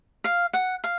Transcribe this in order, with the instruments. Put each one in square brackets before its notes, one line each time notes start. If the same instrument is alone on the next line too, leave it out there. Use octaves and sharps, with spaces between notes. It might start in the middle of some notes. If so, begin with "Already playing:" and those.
[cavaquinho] F5
F#5
F5